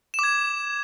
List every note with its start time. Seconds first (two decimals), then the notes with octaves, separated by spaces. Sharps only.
0.14 E7
0.19 D6
0.24 G#6